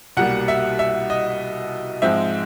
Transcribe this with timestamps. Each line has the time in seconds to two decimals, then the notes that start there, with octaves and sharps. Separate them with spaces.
0.17 C2 B2 G3 A#3 F#5
0.48 E5
0.79 E5
1.10 D#5
2.02 G#2 F3 G#3 C4 E5